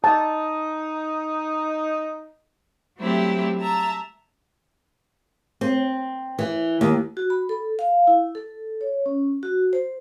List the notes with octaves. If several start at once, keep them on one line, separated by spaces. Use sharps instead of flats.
D#4 A5
F#3 G3 A3 C4 E4 G4
E5 A5 A#5
C4
E3
D#2
F#4
B5
A4
F5
E4
A4
C#5
C#4
F#4
C5